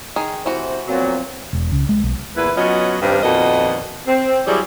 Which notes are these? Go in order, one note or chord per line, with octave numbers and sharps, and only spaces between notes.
D#3 G#4
A2 C3 E3 F#4 C5
A#2 F3 F#3 B3 C4
E1
C#2
G#3
B1
E2 A#2 E4 B4
F#3 B3 C#4 F4 D#5
G2 D#3 G3 B3 C4 A#4
F2 A#2 D#3 B3 F#4 D#5
C4
F#3 G3 E4 G#4 C#5 D5